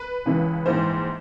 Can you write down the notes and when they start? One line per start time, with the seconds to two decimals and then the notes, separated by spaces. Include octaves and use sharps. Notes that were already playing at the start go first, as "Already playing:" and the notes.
Already playing: B4
0.26 C#2 C#3 E3
0.66 A#1 G#2 E3 C5